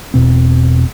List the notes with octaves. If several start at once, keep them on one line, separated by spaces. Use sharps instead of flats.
E1 B2 C4